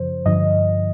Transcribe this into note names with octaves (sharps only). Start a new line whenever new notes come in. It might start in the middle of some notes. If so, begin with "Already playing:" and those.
Already playing: F#2 C#3 F3 C5
G2 D3 F3 D#5